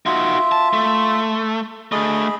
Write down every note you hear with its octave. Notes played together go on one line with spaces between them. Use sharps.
D#4 F4 F#4 E5
A5
A3
D2 A3 G#4 D#5 B5